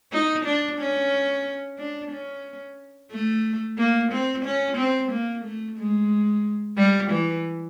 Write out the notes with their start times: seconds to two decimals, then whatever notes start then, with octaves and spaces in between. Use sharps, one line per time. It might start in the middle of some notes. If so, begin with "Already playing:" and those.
0.12 D#4
0.45 D4
0.79 C#4
1.78 D4
2.11 C#4
3.11 A3
3.77 A#3
4.12 C4
4.45 C#4
4.77 C4
5.11 A#3
5.45 A3
5.78 G#3
6.77 G3
7.11 E3